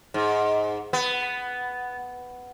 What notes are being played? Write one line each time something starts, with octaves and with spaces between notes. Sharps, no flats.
G#2
B3